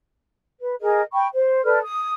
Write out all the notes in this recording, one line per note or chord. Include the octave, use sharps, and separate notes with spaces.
B4
G#4 A#4 D#5
G5 B5 C#6
C5
A4 B4 D5 F6
D#6